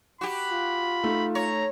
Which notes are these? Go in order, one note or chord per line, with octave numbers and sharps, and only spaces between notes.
F#4 G4 B5
F4
A3 D#4
C#5 A#5